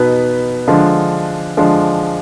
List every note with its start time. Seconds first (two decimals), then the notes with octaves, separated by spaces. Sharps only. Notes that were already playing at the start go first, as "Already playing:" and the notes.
Already playing: B2 B3 D#4 B4
0.67 D3 F3 G#3 D4
1.57 D3 F3 G#3 D4